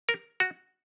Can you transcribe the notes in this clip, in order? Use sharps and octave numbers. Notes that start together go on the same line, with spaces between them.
A#4
F#4